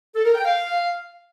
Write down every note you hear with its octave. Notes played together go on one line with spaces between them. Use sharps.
A4
A#4
G5
F5